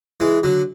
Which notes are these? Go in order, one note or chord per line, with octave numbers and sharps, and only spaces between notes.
E3 G#3
D3 F#3